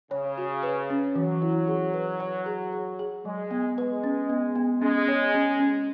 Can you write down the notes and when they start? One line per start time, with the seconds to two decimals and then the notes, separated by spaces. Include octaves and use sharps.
0.11 C#3 C#5
0.38 F#4
0.63 B4
0.90 C#4
1.15 E3 F#3
1.42 E4
1.68 G#4
1.94 B4
2.20 C#5
2.46 G#4
2.73 G#4
2.99 G#4
3.25 F#3 G#3
3.51 B3
3.78 G#3 B4
4.04 C#4
4.29 B3
4.55 B3
4.82 G#3 C#4
5.08 C#5
5.34 C#4
5.60 C#4